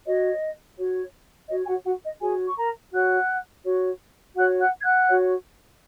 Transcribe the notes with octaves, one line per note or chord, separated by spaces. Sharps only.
F#4 C#5 D#5
F#4 C#5
F#4 C#5 D#5
G#5
F#4 F#5
F#4 F#5
D#5
F#4 G#4 C#5 G#5
C#6
A#4 A#5
F#4 C#5 F#5 F#6
F#4 C#5
F#4 C#5 F#5 F#6
F#5 F#6
G#6
F#5 F#6
F#4 C#5